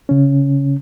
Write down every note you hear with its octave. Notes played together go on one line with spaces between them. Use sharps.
C#3 C#4